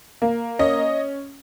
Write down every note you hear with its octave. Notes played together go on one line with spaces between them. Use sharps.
A#3
C#4 D#5